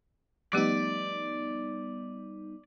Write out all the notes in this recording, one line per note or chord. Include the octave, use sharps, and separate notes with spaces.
F3 G3 A3 B3 D#4 G4 D5